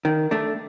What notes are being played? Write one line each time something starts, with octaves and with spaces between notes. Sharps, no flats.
D#3
A3 D4